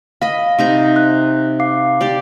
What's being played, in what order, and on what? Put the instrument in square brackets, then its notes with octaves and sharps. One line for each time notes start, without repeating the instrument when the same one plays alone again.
[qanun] D#5 B5 [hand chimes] F5
[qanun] C3 D#4 A#5
[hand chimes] F#6
F5 D6 C7
[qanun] G4 D5